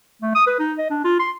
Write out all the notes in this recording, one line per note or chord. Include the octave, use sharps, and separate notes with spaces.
A3
D#6
B4
D#4
D#5
D4
F4
C6